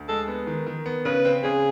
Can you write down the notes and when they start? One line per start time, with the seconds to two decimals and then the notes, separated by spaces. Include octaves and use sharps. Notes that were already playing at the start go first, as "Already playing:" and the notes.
Already playing: D2
0.08 G#3 A4
0.28 B3
0.47 D#3
0.67 D#3
0.86 B3
1.05 C#3 B4
1.25 C4
1.43 C#3 G#4